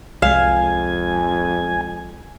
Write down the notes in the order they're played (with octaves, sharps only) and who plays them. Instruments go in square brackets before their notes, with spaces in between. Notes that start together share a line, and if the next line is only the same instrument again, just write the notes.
[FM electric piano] C2 G#3 [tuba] F2 [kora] F5 [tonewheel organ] G#5